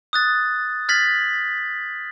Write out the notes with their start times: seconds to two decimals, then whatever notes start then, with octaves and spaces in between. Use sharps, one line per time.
0.13 D#6 F#6 A6
0.89 F6 G#6 A6 B6 F#7